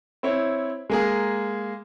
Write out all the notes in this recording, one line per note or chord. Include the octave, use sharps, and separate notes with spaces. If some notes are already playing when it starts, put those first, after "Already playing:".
C4 E4 C#5
G#3 A#3 G#4